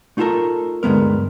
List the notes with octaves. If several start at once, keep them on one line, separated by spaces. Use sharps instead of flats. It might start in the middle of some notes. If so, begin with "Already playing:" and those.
A3 D#4 F4 G4 A4 A#4
D2 G2 G#3 B3 A#4